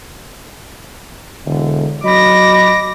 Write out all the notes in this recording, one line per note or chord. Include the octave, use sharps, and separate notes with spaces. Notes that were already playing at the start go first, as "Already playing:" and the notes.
E1 D3
F#3 D#5 B5 D6 A#6